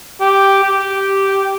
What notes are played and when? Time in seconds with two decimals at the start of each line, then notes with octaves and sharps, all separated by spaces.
0.21 G4
0.63 G4